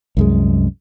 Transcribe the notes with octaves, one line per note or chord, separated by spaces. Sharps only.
C2 F#2 G#3